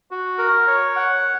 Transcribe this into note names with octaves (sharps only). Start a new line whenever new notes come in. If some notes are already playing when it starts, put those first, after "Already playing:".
F#4
A#4
C#5
F#5